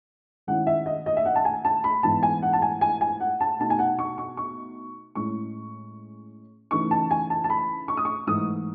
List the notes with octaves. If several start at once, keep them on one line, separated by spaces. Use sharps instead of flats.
D#3 G#3 C#4 E4 F#5
E5
D#5
D#5
E5
F#5
A5
G#5
A5
B5
G#2 E3 B3 E4 A5
G#5
F#5
A5
G#5
G#5
G#5
F#5
A5
B2 A3 D#4 A5
G#5
F#5
C#6
C#6
C#6
A2 G#3 C#4 E4 C#6
C#3 E3 A3 D#4 C#6
A5
G#5
A5
A5
B5
C#6
D#6
C#6
G#2 E3 A3 D#6